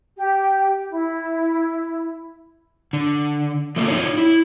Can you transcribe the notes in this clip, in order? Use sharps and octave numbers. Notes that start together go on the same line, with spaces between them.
G4
E4
D3
F3 A3 A#3
D#4 F4 G4 C#5
E4